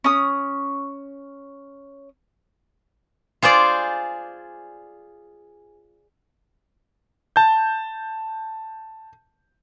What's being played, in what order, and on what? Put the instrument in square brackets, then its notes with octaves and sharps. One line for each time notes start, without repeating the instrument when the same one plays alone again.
[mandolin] C#4 D#6
[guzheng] F4 G#4 C5 D5
[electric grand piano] A5 G6